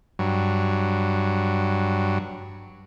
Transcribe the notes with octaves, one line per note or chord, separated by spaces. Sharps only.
G2 F#3